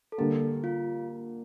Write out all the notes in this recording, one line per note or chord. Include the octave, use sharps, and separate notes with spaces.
A4
D3 G3 A#3 G4
F4